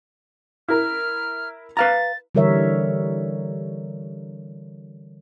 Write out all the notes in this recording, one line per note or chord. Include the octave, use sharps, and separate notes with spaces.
E4 A#4 F6
B4 F5 A#5 A6
D3 E3 G3 A#4 C#5 E5